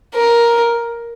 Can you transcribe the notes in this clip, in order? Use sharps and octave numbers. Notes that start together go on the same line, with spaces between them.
A#4